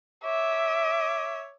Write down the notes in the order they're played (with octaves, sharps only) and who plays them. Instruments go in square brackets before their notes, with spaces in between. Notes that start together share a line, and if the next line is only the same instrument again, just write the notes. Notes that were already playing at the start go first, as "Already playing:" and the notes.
[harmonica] C#5 D6 [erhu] E5